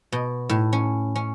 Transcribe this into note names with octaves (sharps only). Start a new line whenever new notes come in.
B2
A2
C#4
C#4